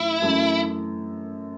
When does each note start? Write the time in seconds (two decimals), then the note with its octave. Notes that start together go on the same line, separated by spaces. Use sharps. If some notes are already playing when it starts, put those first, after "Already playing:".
Already playing: F#2 E3 A3 E4
0.22 F#2 E3 A3